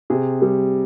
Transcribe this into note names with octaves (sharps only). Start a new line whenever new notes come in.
C3 G#4
G3